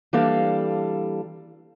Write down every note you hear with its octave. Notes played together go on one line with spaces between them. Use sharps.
E3 G3 A#3 D4 A4 F5